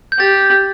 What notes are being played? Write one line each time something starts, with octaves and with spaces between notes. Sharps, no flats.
G6
G4 A6